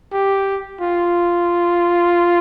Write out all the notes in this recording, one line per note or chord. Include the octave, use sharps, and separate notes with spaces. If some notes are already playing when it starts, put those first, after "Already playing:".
G4
F4